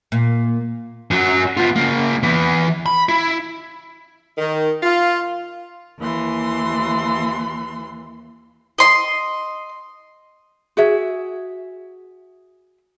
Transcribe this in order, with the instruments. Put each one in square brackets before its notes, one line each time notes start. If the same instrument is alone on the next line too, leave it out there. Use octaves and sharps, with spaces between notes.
[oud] A#2
[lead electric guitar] F#2 F#3
B3 F4
C#3 A#3
E3 B3
B5
E4
[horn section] D#3
F4
[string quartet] D#2 E3 C6
[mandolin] D#5 C6
[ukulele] F#4 G#4 E5